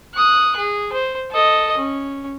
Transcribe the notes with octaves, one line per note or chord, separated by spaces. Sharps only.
D#6 F#6
G#4
C5
A4 D#5
C#4